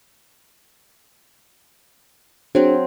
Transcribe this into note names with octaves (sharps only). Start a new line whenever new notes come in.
F#3 C4 D4 G#4 C5